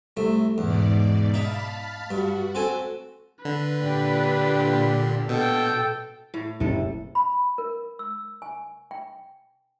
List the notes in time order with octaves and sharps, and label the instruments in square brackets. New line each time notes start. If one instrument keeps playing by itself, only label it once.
[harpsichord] C2 A3
[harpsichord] E2 [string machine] G#2 B2 D5
[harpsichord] D#4 E5 [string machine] F5 A5 B5
[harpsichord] G2 [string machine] F#4
[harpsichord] C4 A4 G#5
[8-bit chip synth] D3 [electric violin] B4
[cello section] A#2 [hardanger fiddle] D4 G4
[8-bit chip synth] B2 [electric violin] A4 G5
[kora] A2
[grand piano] F#1 [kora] C3 A4
[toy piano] B5
A#4
E6
G#5
G5